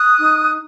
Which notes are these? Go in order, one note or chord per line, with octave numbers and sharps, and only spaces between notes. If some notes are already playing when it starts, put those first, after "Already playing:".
Already playing: D#6 F#6
D#4